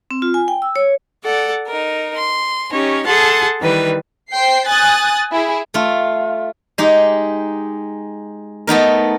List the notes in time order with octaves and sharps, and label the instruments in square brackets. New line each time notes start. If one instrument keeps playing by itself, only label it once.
[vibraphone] C4
F4
G#5
G5
E6
C#5
[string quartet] A4 D5 F#5
D#4 A#4
C6
C#4 D#4 G4 C#5
G#4 A4 F#5 A5 C6
D#3 E3 G3 B4
[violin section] C5 G5 C7
G#5 D#6 F#6 A6
E4 G#4
[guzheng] A3 F4
G#3 D#4 G4
A3 B3 D#4 A#4